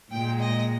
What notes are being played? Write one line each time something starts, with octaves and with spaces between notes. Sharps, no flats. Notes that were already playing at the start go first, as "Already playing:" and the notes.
A#2 G#3 G5
D#5